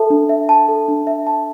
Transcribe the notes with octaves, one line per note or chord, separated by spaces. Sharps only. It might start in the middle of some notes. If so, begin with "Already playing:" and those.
Already playing: A4 E5 A5
D4
E5
A5
A4
D4
E5
A5